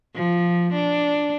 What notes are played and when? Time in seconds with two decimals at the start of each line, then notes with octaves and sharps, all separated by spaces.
0.15 F3
0.74 D4